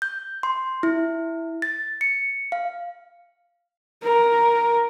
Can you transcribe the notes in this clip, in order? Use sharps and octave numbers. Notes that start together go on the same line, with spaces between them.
G6
C6
E4
A6
C#7
F5
A#4